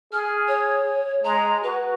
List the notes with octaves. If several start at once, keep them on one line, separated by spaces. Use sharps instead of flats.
G#4 F6
C#5
G#3 A#5
F#4 B4